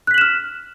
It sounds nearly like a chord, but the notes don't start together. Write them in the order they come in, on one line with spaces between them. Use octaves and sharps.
F#6 B6 F#7 E7 F6